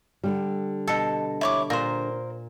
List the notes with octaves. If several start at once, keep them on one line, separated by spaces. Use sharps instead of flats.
D3 G3
B2 A4
E4 C#5 D6
A#2 A#4 C5